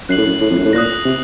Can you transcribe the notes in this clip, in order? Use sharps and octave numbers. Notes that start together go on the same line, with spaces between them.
F#2 F#6 C7 F#7
A2
F#2
A2
F2
F#2
A2
A#2 D#6 F#6 A#6
C3